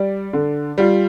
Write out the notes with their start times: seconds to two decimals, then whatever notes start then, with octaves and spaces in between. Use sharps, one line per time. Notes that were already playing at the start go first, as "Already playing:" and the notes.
Already playing: G3 D5
0.33 D3
0.78 G3 F4